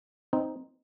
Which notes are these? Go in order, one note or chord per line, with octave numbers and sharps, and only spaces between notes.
C4 D#4